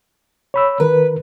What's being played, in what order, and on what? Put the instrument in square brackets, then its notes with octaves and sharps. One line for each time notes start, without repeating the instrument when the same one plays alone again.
[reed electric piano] C#5 B5 E6
[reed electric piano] D#3 A#4 [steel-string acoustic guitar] B4